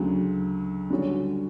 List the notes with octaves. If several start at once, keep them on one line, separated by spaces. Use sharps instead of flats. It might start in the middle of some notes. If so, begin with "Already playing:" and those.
Already playing: D2 C#3 F#3
D3 G3 C#4 F#4 C#5